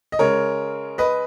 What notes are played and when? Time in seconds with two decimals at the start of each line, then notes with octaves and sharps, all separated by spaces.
0.12 D#5
0.19 C#3 G#3 A#4 C#5
0.98 B4 D#5